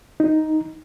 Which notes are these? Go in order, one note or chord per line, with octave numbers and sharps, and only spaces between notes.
D#4